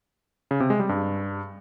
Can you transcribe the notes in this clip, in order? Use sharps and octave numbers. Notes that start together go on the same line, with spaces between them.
C#3
C3
G#3
G3
G2